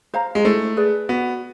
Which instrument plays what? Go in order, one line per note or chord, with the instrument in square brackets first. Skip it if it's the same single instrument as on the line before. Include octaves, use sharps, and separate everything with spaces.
[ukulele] C5 F5 A#5
[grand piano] G#3
[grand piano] A3 [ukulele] E4
[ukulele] G#4 B4 D5
[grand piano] B3 [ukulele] F#4